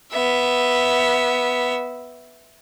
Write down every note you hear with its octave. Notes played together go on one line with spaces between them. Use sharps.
B3 E5